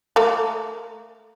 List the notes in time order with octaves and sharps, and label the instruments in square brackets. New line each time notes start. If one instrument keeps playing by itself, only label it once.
[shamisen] A3 A#3